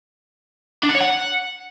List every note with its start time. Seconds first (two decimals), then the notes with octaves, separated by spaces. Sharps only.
0.84 D4
0.89 F#5
0.95 C#5
1.01 F#5